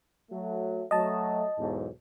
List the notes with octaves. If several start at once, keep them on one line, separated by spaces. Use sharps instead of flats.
F#3 A3
F#3 A3 D#5 A5
B1 E2 G#2